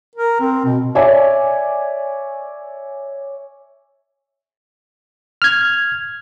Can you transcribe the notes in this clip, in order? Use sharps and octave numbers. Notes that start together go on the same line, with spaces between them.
A#4
C4
B2
C#5 D5 E5 G#5
F6 G#6